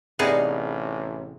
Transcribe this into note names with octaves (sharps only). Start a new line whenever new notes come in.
A1 C3 B3 D#4 G#4 A#4 D5